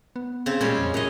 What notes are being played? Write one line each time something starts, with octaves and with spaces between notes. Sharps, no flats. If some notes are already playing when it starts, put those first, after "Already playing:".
B3
C#3 C4
A#2 G3 G#3 C#4
F2
F#2 A2 C#5 D#5